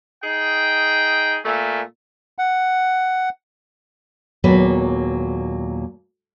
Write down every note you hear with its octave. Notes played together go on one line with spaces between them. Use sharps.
D#4 G#4 G5
A#2 A3
F#5
D#2 A#2 F#3 G#3 B3 B4